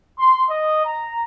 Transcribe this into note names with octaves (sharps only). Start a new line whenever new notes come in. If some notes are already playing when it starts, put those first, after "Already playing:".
C6
D#5
A#5